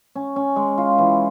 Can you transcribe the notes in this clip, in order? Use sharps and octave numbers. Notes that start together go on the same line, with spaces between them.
C#4
C#4
G#3
F4
E3